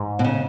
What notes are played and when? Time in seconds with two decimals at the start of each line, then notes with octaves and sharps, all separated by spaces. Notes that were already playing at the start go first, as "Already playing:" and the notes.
Already playing: G#2
0.19 B2
0.24 C#3